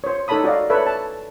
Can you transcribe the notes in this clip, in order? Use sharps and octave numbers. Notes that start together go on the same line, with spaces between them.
C5 C#5
D#4 A4 C#5 A5 B5 D#6
F#4 D5 D#5 F5
A4 B4 C#5 E5
A5